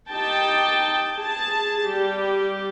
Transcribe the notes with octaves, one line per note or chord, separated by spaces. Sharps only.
D#4 G4 G5 A5
G#4 A5
G3 G4